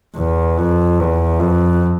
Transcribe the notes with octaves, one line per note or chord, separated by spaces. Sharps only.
E2
F2
E2
F2